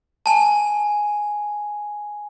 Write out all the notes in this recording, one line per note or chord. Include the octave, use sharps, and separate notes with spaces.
G#5 A5